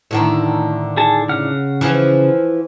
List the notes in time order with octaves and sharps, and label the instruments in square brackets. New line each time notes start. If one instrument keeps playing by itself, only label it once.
[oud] A2 D3 D#3
[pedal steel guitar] G#4 A4 A5
C#3 F#5 F6
[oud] E3 F3